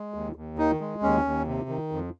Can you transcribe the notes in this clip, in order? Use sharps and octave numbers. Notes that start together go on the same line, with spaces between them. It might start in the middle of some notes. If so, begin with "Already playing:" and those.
Already playing: G#3
D#2
D#2
D#3 D#4
G#3
D#2 C#4
D#2
C3
D#3
F2